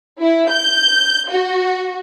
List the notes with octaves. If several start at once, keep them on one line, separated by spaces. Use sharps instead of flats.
E4
G6
F#4